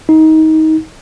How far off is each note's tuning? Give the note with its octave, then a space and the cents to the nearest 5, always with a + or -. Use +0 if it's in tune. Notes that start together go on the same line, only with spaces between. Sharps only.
D#4 +25